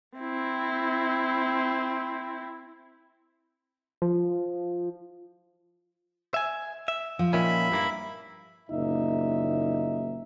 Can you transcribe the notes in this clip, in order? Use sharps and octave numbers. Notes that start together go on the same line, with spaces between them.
C4 E4
F3
E5 G#5
E5
F3
A#2 D#3 C#4 E5 B5
G2 A#3 E4
F#1 A#2 D#4 E5